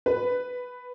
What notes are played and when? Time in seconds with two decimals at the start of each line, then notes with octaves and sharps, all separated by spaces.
0.06 B4